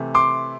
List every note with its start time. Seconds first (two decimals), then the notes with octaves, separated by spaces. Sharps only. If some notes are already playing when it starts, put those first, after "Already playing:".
Already playing: C3 E3 A3
0.15 C6 D6